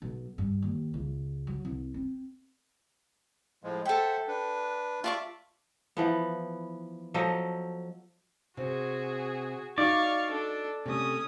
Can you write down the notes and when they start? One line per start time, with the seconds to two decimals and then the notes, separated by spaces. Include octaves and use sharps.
0.02 B1
0.38 G2
0.62 D#2
0.94 C#2
1.47 F#3
1.65 C2
1.94 C4
3.63 A2 F3 G#3
3.85 A4 C5 E5 F#5 G5
4.28 D4 B4
5.04 F4 D5 E5 A5 C#6
5.97 E3 F3 B3
7.14 F3 F#3 A4 D#5
8.57 C3 F#4 G#4
9.78 D#4 F#4 D5 F5 C#6
10.31 D4 A4
10.86 C3 A3 C#4 D#6